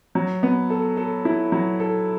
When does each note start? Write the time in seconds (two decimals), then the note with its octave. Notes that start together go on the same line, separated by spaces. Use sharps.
0.15 F#3
0.43 B3
0.70 A4
0.97 A4
1.25 E4
1.52 F#3
1.80 A4